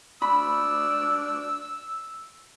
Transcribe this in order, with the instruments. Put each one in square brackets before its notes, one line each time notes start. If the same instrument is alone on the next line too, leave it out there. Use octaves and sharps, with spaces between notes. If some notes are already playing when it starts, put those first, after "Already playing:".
[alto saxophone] D4 [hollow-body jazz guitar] B5 [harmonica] E6